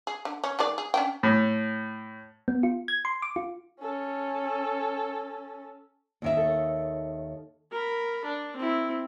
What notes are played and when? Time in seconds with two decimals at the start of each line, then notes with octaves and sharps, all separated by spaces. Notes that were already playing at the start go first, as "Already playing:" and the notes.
0.07 G#4
0.25 D3
0.44 C#4
0.59 D#3 G#3 D5
0.78 G#4
0.94 C#4 D4 G5
1.23 A2
2.48 B3
2.63 F4
2.88 G#6
3.05 C6
3.22 D6
3.36 F4
3.80 C#4 A4
6.22 D#2 D#3 E5
6.37 A4 C#5
7.72 A#4 B5
8.25 D4
8.57 C4 E4